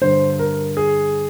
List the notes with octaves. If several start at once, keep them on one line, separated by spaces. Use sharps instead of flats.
G2 D3 C5
A#4
G#4